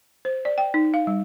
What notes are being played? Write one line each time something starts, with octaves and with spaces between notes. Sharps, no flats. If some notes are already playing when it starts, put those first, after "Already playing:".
C5
D5
G5
D#4
F5
G3